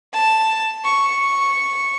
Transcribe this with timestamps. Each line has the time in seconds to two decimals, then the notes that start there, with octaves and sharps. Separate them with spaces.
0.13 A5
0.85 C#6